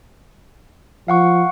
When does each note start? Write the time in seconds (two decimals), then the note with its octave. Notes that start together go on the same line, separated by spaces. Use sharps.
1.08 F3 F5 F#5 C#6